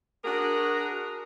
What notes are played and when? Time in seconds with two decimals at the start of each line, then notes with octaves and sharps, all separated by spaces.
0.24 D4 F#4 G#4 A#4